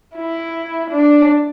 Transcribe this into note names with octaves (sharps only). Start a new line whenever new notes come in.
E4
D4